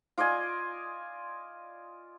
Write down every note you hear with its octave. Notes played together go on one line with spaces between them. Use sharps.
F4 D5 D#5 G#5